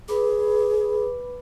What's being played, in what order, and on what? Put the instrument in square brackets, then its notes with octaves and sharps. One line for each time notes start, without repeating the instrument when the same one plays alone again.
[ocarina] G#4 [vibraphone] B4 B5 D6